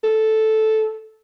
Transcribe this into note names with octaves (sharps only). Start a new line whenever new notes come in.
A4